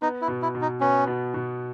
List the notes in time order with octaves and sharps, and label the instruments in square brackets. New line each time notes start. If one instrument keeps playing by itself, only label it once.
[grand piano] B3 [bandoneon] D#4
[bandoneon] E4
[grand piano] B2
[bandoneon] E4
[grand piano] B2
[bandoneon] D#4
[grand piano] B3 [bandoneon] C#4
[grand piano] B2
B2